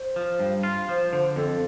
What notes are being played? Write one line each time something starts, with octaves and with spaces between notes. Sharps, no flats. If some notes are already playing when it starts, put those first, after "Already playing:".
Already playing: C5
F3
G2
F4
F3 C5
D3 C5
F2 A4